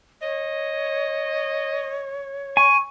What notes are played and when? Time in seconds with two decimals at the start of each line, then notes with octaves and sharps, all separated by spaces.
0.22 C#5 D#5
2.57 G#5 C#6